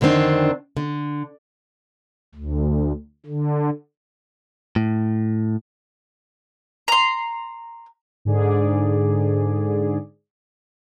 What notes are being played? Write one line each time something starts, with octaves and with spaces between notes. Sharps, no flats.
F2 D3 D#3 C4 D4
D3
D2
D3
A2
A#5 C6
G#2 D3 G#4 D5